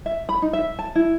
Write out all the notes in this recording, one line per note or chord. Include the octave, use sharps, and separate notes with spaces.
E5
B5
D#4
E5
A5
E4